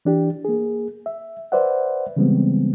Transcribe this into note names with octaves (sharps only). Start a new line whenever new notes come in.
E3 D4 G4
A#3 G#4
E5
B4 C5 D5 E5 F#5
C#3 E3 G3 G#3 B3 C4